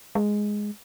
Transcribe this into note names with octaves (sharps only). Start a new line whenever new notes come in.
G#3